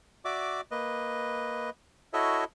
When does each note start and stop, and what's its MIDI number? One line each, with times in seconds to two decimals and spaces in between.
0.25 0.61 66
0.25 0.61 74
0.25 0.61 76
0.25 0.61 86
0.71 1.70 58
0.71 1.70 71
0.71 1.70 75
2.13 2.44 64
2.13 2.44 66
2.13 2.44 69
2.13 2.44 73
2.13 2.44 75
2.13 2.44 76